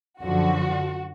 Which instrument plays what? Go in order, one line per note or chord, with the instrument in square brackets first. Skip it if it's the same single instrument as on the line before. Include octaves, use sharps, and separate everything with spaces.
[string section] F#2 D3 F3 F#4